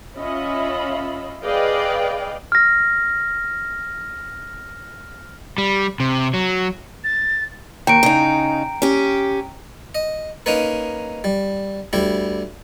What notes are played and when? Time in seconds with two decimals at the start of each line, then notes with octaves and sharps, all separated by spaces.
0.16 C#4 F4 D#5 E5 B5
1.43 G#4 B4 D5 D#5 F5 G5
2.52 F6 A#6
5.58 G3
6.00 C3
6.34 F#3
7.04 A6
7.87 D#2 G5 A#5 D7
8.03 C#3 D#4
8.82 C#4 G4
9.95 D#5
10.46 A#3 C#4 D#4 A#4 B4
11.24 G3
11.93 D2 G3 E4 G4